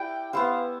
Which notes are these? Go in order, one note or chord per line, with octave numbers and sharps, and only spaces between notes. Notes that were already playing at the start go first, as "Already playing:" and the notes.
Already playing: E4 G4 D5 G5
B3 E4 G4 C5 F5